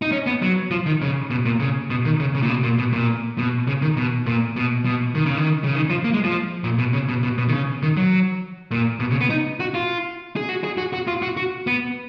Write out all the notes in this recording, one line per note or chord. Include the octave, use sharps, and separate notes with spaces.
D#4
C#4
B3
F#3
F3
D#3
C#3
B2
A#2
C#3
B2
D#3
C#3
C#3
A#2
B2
A#2
B2
A#2
B2
C#3
D#3
B2
A#2
B2
B2
D#3
C#3
D#3
C#3
D#3
F3
A#3
G#3
F3
A#2
B2
C#3
B2
B2
B2
D#3
C#3
D#3
F#3
A#2
B2
C#3
B3
D#4
F#4
F4
G#4
F#4
G#4
F#4
F#4
F4
F#4
F#4
B3